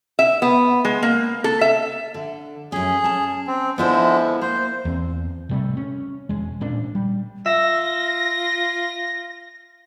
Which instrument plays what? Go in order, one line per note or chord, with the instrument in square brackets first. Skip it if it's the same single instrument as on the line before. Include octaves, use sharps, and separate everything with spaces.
[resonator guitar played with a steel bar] E5
B3
G#3
A#3
A4
E5
[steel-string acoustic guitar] D3
[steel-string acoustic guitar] F#2 C#4 [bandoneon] G#4
[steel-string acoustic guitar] C#4 A5
[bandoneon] C4
[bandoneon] D3 F3 G#3 [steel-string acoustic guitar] B3 E4 C5
[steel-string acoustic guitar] A#3 [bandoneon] C5
[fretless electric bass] E2 C4
C3 G3 A3
C#4
E1 G#3
A1 A#2 C#4 D4
G3
[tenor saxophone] F4 [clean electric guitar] E5 [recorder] A#6